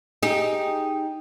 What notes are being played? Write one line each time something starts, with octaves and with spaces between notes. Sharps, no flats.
D#4 G4 G#4